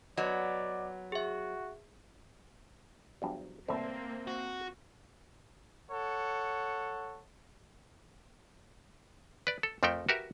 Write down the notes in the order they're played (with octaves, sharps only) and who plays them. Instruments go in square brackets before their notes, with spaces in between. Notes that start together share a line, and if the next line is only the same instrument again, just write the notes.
[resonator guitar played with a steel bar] F#3 B3 [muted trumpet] D5 [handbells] D#5
[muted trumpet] F#4 [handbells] G#4 E5
[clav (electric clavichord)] E2 G2 F3 [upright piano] F#3
[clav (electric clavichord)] C2 A2 E3 [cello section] A#3 C4 [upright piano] C5 E5 A5
[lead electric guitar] F#4
[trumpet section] A4 C#5 F#5
[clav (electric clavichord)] B4 D5
A4
F2 F3 A3 A4 A#4 G5
F#4 G4 A#4 B4 E5